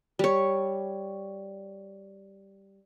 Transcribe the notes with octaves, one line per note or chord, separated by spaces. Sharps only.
G3 C#5